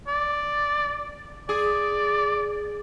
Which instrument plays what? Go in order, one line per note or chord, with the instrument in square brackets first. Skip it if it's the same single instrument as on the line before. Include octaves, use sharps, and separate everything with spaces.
[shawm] D5
[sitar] G#4 [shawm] D5